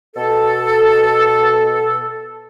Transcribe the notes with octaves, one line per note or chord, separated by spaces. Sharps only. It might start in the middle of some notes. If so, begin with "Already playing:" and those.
B2 A4